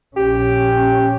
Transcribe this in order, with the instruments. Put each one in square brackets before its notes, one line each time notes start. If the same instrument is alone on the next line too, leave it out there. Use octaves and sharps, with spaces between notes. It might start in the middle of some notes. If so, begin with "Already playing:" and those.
[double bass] A#1 C#4 [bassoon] G4